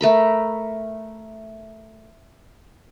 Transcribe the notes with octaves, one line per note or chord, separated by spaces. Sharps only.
A3 A#4 B5